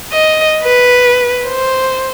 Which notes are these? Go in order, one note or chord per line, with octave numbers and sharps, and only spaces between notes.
D#5
B4
C5